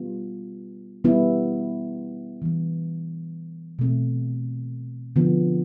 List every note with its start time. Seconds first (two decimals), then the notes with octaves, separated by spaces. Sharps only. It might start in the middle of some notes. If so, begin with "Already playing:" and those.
Already playing: G3 B3 F4
1.04 G3 B3 E4
2.42 E3 G3 B3
3.79 B2 A3 C4
5.16 D3 F3 B3